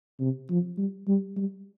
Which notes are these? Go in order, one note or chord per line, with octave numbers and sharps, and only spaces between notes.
C3
F3
G3
G3
G3